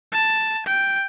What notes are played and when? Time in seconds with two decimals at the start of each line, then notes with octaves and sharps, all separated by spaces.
0.12 A5
0.66 G5